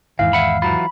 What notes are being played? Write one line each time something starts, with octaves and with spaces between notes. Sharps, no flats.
E2 G#2 D#3 E3 F5
E5 F#5 B5
E3 F#3 F4 B5